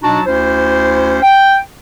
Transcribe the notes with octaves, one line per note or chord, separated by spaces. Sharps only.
B2 F#3 D4 D#4 F#4 A5
D2 C#4 E4 C5
G5